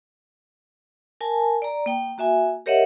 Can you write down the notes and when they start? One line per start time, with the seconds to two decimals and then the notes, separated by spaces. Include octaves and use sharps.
1.21 A#4 G#5 A5
1.62 D5 A#5
1.86 A#3 G5
2.18 A#3 F#4 E5 G#5
2.66 G4 A#4 C#5 D#5 E5 F#5